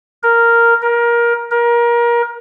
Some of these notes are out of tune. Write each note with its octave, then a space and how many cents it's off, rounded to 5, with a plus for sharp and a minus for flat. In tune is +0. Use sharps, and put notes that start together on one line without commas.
A#4 -5
A#4 +20
A#4 +25